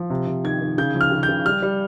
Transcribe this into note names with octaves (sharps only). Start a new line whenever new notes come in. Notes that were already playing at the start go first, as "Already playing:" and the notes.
Already playing: F3
C3
C3
D#3 G#6
D#3
C#3 G6
F3
F6
C#3
G6
C#3
G3 F6
G3